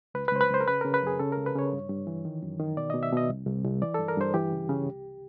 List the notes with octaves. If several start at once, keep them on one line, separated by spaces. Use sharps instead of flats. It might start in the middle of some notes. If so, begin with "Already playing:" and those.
C#2 B4
B4
C#2 C5
B4
C#2 C5
A#4
C#3 B4
C#3 A#4
B4
F#2 G#4
C#3 A4
C#2 A#4
B4
C#3 C#5
G2
G2
E3
D#3
F#2
D#3
B2 D5
B2 D#5
E5
B2 D#5
C2
C2
C2
E3 D5
G2 A4
A#4
G2 C5
E3 G4
C#3
C#3
C2